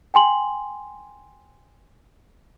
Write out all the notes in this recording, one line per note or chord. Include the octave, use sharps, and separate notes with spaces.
G5 G#5 C6 F#7